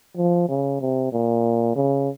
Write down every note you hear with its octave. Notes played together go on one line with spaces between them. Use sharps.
F3
C#3
C3
A#2
C#3